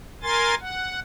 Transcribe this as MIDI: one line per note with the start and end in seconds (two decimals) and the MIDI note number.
0.23 0.55 70
0.23 0.55 80
0.23 0.55 84
0.23 0.55 93
0.61 1.00 78